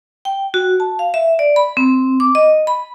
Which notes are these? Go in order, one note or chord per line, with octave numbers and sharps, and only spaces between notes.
G5
F#4
A5
F5
E5
D5
B5
C4
D6
D#5
B5